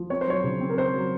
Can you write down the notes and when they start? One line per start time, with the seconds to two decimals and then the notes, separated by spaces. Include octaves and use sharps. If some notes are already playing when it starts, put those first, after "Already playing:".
Already playing: F3
0.10 C4 C#5
0.21 C5
0.27 F#3 C#5
0.44 C#3
0.61 C4
0.70 A#4
0.78 C4 C5
0.94 F#3